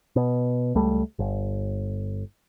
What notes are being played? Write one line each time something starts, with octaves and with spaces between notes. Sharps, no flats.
B2
C#2 G3 A3
G1